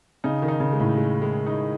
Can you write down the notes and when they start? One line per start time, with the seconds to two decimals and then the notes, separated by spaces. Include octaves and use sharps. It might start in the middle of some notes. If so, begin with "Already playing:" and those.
0.24 C#3 D#4
0.42 D#3
0.48 D#4
0.60 C#3
0.73 G#3
0.80 A2
0.97 G#3
1.22 G#3
1.47 D#4